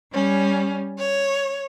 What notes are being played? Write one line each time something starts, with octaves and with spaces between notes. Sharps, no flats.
G3 C#4
C#5